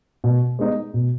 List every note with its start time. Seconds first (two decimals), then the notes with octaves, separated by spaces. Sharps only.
0.24 B2
0.59 G#3 B3 D#4
0.94 B2